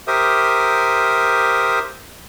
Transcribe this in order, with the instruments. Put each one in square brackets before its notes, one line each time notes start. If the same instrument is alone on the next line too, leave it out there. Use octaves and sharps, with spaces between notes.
[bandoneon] G4 A#4 C5 E5 D#6